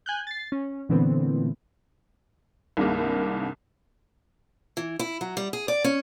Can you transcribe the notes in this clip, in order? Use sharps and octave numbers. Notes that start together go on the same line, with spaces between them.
G#5 F#6 G6
A6 C7
C#4
A#2 D3 E3 A3 B3 C4
C2 G2 C3 D#3 G#3 A#3
E3
E4
F#3
G3
G#4
D5
C#4